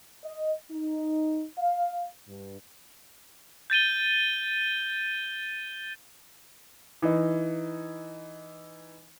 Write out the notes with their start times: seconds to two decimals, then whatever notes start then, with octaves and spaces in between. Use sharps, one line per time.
0.24 D#5
0.69 D#4
1.58 F5
2.28 G2
3.70 G6 A6 D#7 G7
7.02 E3 D#4